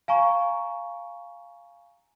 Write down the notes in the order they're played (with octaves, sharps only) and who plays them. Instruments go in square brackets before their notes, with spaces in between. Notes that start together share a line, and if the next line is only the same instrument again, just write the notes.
[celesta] F5 G#5 A#5 C#6